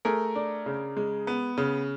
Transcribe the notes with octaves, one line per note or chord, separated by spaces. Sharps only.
A3 G#4 A#4
D4
C#3
G#3
B3
C#3